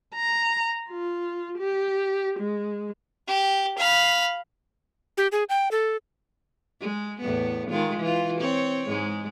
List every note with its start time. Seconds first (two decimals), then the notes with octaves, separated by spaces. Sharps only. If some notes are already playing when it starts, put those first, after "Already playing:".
0.15 A#5
0.89 F4
1.59 G4
2.40 G#3
3.28 G4
3.78 F5 B5
5.18 G4
5.32 G#4
5.49 G5
5.71 A4
6.80 G#3
7.20 E2 A2 B3
7.70 D#3 G#3 F4
7.99 E3 F4
8.40 C4 C#5
8.88 G#2 G#3